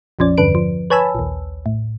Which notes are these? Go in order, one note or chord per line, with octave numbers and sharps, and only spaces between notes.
A#1 F2 F3 C#4 D5
E2 G2 D3 B4 D7
F3
B4 C#5 G#5 A5 B5 E6
A#1 D#2
A2